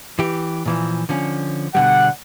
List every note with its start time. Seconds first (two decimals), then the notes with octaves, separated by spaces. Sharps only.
0.19 E3 G4
0.65 A#2 E3 F3
1.09 D3 F3 C#4
1.75 B2 D3 G3 F#5